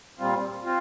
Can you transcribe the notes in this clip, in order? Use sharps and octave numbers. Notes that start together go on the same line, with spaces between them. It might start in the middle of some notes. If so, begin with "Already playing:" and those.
A#2 G3 C4 F4
C4 F4